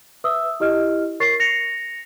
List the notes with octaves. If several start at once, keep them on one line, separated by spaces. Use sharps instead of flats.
B4 E5 D#6 E6
E4 G4 D#5 F6
A#4 C#5 C#6 A6 C7
A#6 C#7 F7